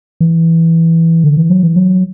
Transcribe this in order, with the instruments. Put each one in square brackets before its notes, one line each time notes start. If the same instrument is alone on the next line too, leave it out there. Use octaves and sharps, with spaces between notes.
[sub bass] E3
D3
E3
F#3
E3
F#3